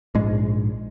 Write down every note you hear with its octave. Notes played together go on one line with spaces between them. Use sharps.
A#1 G#2 G#3